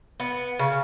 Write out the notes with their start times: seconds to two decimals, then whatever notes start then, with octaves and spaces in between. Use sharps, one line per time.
0.20 B3
0.59 C#3